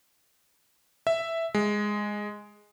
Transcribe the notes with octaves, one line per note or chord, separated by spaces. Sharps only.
E5
G#3